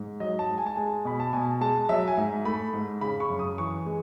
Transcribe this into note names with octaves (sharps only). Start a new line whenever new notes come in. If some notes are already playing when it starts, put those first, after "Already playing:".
Already playing: G#2
F#3 D#5
A5
G#2
G#5
A5
G#3 G#5
B2 B5
A5
B2 G#5
G#3 A5
F#3 E5
G#5
G#2
A3 B5
G#2
C#3 B5
C#6
F#2
D#6
E3 C#6
G#3